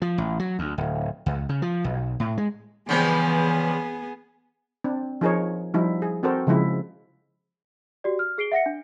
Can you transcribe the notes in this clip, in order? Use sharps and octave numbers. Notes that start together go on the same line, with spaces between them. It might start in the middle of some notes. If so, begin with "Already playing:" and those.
F3
A1
F#3
D2
D1
C#2
C#3
F3
B1
A2
G#3
C#3 E3 F3 G3 B3 G#4
C4 D4
F3 D#4 G#4 A#4 C#5
F3 G3 D#4 E4
G#4
C4 F#4 A4 A#4 C5
C#3 F3 G#3 E4
F#4 G4 D5
F6
G#4 C7 D7 G7
E5 F#5 A#6 C#7
D4